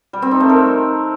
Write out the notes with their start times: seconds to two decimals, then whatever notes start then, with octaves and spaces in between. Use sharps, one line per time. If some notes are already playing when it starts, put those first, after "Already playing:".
0.13 G3
0.22 C4
0.31 D#4
0.40 A3
0.49 A#4